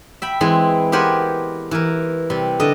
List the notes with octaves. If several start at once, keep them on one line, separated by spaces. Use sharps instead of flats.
E5 G5 B5
E3 G#3 C4 E4 C6
B3 G4 A#4 C5 F#5 G#5
E3 A#4
C3 G3
D3 D#5